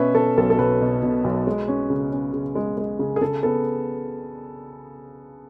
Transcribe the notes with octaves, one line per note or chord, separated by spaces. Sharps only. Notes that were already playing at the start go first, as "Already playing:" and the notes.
Already playing: B2 C#4 B4 E5
B2 A4
B1 A4
A4
B1 B4
B2
B2
B1
G#3
C#4
C#3
C#4
C#3
G#3
G#3
C#3
G#4
C#3 A4
B3 A4